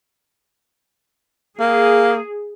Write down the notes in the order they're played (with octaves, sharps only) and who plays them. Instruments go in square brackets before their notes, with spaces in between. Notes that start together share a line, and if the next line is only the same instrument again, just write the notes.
[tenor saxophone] A#3 [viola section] G#4